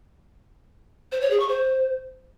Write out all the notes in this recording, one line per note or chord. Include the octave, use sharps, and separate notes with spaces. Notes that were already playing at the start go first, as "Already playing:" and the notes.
C5
C#5
G#4
C#6
C5